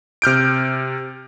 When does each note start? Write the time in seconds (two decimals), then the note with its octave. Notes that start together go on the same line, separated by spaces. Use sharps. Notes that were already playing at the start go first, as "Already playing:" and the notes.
0.22 C3 F6 G6 D7